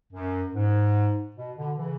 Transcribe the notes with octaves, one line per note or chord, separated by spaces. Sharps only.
F#2
G#2
B2
B2 D3
C#3 E3